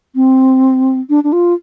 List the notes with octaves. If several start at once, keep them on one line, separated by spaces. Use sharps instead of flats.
C4
D4
D4
F4